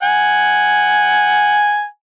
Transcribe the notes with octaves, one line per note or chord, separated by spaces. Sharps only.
F#5 G#5